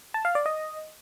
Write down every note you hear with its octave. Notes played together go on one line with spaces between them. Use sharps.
A5
F5
D5
D#5